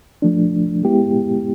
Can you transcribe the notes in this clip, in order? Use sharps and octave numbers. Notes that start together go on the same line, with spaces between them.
F3 A3 D4
G#3 B3 E4 G4